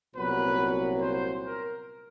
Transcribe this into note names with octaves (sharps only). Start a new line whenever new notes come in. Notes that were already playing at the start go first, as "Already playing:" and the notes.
C2 A#2 F#3 B3 B4
C5
A#4